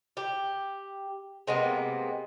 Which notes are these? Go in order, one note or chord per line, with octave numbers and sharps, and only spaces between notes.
G4
C3 G#3 A#3 B3